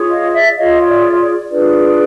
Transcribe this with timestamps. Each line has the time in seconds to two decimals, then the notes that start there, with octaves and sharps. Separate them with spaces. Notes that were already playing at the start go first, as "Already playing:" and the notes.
Already playing: F4 G#4 C#5
0.10 D#5 F5
0.33 D5 E5
0.56 F4 G#4 C#5 D#5 F5
0.88 D5 E5
1.18 D5
1.49 D4 F4 G#4 B4 D5